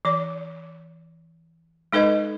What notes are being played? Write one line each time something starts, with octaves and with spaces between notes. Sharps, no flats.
E3 D5
G#3 D#4 A4 B4 D#5